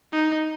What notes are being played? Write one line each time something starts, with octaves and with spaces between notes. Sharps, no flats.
D#4